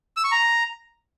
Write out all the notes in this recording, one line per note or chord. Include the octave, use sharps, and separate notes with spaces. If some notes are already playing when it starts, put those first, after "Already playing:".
E6
C#6
A#5